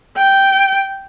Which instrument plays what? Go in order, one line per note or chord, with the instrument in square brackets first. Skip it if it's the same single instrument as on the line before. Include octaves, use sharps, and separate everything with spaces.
[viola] G5